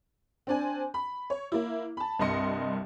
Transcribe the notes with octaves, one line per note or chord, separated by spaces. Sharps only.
C4 D4 G#5
B5
C#5
A#3 E4
A5 B5
C2 G2 D#5 C6 A#6 C#7